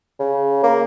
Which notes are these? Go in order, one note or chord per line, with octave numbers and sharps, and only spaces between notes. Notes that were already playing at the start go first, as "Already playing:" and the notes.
C#3
A#3